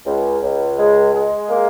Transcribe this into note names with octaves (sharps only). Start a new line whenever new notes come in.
C#2
C#2
G#3
G#3
A#3